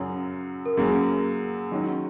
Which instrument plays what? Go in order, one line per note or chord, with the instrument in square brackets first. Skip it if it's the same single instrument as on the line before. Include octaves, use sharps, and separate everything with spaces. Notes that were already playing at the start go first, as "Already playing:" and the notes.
Already playing: [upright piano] F#2 C#3 F#3 C#4 G#4
[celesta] A#4
[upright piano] F#2 C#3 F#3 A#3 C#4 [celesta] G#4
[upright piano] D#3 F#3 C#4